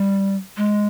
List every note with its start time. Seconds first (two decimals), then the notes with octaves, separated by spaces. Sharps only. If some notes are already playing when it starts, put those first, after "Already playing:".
Already playing: G3
0.57 G#3